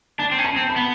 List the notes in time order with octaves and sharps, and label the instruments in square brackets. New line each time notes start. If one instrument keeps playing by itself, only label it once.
[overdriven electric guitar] D4 [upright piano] A5
[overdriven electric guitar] C4
C#4
[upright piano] A5
[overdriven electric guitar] C4
[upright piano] B5
[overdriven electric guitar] B3